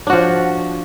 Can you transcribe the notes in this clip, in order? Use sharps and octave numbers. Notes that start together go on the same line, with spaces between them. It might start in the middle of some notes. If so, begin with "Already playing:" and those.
F3 D4 F#4